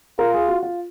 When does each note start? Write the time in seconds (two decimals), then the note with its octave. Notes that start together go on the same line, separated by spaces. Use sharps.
0.19 F4 A#4
0.34 G#4
0.48 F#4
0.63 F4